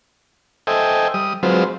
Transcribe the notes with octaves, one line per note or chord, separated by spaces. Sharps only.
A4 C5 D#5 E5 G5 G#5
G3 D#6
F#3 G#3 C4 F4 B4 C5